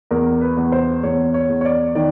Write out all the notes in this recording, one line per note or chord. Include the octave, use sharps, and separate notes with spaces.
E2 A#4
B4
E2
C5
E2 C#5
C#5
E2
C#5
D5
D#3 D5